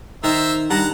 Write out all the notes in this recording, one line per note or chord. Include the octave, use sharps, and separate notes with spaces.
D#3 C5 E5 A#5
G2 F#5 A5 A#5